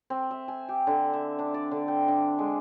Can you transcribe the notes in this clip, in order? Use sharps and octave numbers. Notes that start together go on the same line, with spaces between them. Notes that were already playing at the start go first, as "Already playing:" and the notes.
C4
E5
G#5
G4
D3
E5
D4
D5
D3
G5
D4
G#3